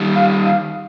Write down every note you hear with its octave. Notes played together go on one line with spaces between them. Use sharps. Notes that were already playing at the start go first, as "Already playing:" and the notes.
Already playing: D#3 G3
F5
F5